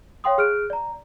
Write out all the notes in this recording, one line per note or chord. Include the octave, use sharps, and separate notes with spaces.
C#5 F5 G5 C6 D#6
G#4 F6 F#6 D7
D5 A#5